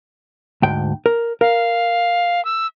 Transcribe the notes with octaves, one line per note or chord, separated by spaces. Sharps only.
D2 G#2 G5
A#4
A#4 F5
E6